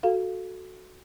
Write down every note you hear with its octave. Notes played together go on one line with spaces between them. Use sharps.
F#4 A4 F5